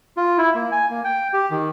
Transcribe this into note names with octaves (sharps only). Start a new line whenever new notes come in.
F4
E4
A#3
G#5
A#3
G5
G4
D#3